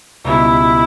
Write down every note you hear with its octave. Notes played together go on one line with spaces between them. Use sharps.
C#2 B2 G3 E4